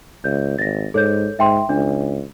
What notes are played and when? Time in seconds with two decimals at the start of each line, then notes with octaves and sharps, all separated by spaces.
0.24 C#2 G6
0.59 G#1 A6 A#6
0.94 G#2 A4 C#5 G6
1.39 G#2 E5 G5 C6
1.69 C#2 D4